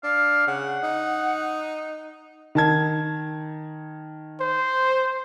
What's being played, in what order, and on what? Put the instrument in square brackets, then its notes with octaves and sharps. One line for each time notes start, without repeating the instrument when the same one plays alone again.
[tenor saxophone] D4 [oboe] F5
[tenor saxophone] C#3 [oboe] F#5
[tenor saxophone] D#4
[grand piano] D#3 A5 G#6
[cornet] C5